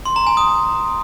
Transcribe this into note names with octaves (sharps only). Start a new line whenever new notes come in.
C6
A#5
G#5
D#6